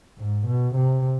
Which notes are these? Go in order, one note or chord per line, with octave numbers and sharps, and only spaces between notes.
G#2
B2
C3